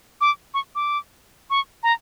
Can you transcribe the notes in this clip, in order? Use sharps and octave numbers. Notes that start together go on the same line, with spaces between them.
D6
C#6
D6
C#6
A#5